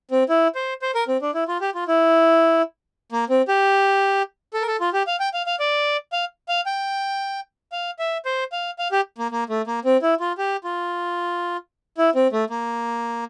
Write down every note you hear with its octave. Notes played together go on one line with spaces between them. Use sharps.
C4
E4
C5
C5
A#4
C4
D4
E4
F4
G4
F4
E4
A#3
C4
G4
A4
A#4
A4
F4
G4
F5
G5
F5
F5
D5
F5
F5
G5
F5
E5
C5
F5
F5
G4
A#3
A#3
A3
A#3
C4
E4
F4
G4
F4
E4
C4
A3
A#3